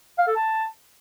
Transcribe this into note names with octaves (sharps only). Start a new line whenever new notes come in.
F5
A4
A5